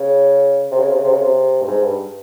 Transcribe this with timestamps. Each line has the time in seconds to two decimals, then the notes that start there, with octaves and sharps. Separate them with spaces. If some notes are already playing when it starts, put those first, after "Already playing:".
Already playing: C#3
0.72 C3
0.80 C#3
0.89 C3
0.96 C#3
1.04 C3
1.12 C#3
1.21 C3
1.62 G2
1.67 G#2
1.83 G2